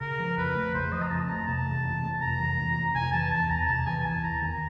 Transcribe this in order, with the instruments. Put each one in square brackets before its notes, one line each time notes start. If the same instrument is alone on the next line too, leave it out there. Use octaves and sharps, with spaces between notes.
[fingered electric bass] C#3 [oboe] A#4
[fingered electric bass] F3
[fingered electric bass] F2 [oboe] B4
[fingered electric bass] A3
[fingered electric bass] C#3 [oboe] C5
[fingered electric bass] F3 [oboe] D#5
[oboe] A#5
[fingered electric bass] F2 [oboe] A5
[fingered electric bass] A3 [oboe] A#5
[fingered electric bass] C3 [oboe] A5
[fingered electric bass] E3
F2
A3
[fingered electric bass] C3 [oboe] A#5
[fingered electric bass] E3
F2
A3
[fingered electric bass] C3 [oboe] G#5
[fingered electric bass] E3 [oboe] A5
[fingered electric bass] E2 [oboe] A5
[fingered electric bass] E2 [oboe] A#5
[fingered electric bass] C3 [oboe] A5
[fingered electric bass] E3 [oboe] G#5
[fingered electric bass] E2 [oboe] A5
[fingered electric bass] E2 [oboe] A#5
[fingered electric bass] D#3 [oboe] A#5